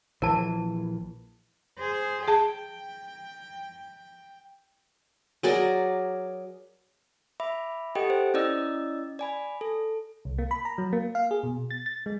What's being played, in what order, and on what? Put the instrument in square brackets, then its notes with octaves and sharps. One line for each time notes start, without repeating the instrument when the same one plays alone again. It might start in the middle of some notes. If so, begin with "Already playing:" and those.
[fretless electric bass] A#1 E3 [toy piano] A#4 A5
[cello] G#4 C5
[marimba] G#4 A5 [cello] G5
[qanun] F#3 G#4 A#4 D5
[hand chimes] E5 B5 D6
G4 A4 D#5 F#5 G5
C5
C#4 E4 D5 D#5 E6
D5 G#5 B5
A4
[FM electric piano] C2
A#3
B5
A#5
F#3
A#3
F5
G#4
B2
A6
A6
G#3